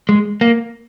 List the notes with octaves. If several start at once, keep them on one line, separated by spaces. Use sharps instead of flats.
G#3
A#3